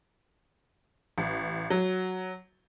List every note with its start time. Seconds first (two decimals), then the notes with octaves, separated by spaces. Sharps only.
1.18 A1
1.70 F#3